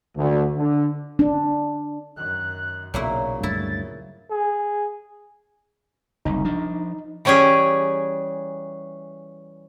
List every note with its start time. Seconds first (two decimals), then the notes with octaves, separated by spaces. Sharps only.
0.17 D2
0.57 D3
1.19 D4
2.16 F#2 D#3 F#6
2.94 B1 A#2 C#3 F#3 A#3 E4 C#5
3.43 D2 G2 A3 E4 A6
4.31 G#4
6.25 F#1 C2 D#4
6.45 F3 D4
7.25 E3 G3 C#4 G4 G#4